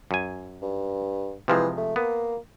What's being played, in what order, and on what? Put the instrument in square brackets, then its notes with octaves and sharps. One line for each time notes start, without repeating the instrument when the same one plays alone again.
[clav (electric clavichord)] F#2 G#5
[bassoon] G2
[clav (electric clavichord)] C3 F3 G#3 [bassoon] E3
[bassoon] A3
[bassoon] A#3 [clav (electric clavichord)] B3